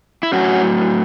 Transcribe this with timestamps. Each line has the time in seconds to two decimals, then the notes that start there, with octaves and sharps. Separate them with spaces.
0.23 E4
0.32 A2 F#3 C#4 F#4